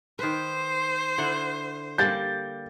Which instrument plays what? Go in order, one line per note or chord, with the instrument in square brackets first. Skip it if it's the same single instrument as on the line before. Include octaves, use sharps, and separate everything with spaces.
[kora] D#3 B4 [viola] C5
[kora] D3 E4 F#5
[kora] G3 A#3 G4 [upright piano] G6 A6